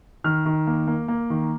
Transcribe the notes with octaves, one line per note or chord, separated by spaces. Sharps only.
D#3 F6
D#3
A#3
A#3
A#3
D#3